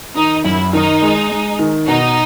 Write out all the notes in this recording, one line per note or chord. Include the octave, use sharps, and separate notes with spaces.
D#3 D#4
F#2 E4
D#3 D#4
G#3
G#3
D#3
B2 D#4